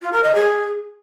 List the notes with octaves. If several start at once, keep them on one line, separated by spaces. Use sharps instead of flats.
F4
A#4
D#5
G#4